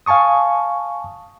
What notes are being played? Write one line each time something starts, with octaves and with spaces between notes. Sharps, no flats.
F5 G#5 A5 C#6 D#6